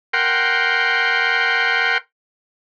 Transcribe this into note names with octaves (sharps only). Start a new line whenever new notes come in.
A#4 F#5 G5 C6